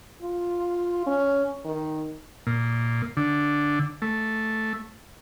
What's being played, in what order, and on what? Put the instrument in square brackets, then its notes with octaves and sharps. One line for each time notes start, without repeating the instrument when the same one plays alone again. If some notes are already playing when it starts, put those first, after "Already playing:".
[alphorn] F4
C#4
D#3
[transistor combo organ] A#2
D3
A3